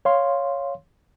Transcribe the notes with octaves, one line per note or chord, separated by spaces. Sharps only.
C#5 F5 C6